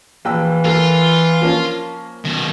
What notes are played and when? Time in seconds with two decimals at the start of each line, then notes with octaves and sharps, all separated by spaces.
0.25 A#1 E3 G5 E6
0.65 A#3 F4 A4
1.41 F3 A#3 C#4
2.25 B2 D#3